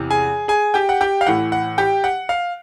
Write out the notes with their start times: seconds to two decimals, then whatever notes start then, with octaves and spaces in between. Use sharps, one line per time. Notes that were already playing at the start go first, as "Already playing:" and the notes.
Already playing: E2 C3 E3
0.10 G#4 G#5
0.48 G#4 G#5
0.74 G4 G5
0.89 F#5
1.01 G4 G5
1.21 F5
1.27 A2 E3 F#5
1.52 F#5
1.78 G4 G5
2.04 F#5
2.29 F5